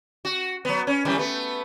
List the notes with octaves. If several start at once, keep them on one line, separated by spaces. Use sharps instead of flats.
F#4
F#3 B3
C#4
F#2 E3 G3
A3 B3